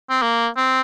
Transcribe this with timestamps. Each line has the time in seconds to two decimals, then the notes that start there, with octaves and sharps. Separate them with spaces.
0.10 C4
0.22 A#3
0.57 C4